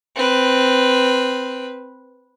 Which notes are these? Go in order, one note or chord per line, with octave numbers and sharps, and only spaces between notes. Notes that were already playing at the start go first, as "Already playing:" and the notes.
C4 B4